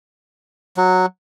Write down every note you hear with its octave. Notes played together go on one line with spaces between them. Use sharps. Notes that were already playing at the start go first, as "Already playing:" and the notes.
F#3